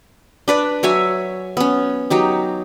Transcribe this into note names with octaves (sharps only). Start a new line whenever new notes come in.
D4 B4 D5
F#3 C#5 E5 G#5
B3 C#4
F#3 D#4 G4